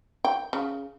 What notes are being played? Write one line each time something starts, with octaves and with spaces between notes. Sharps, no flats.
G5
C#3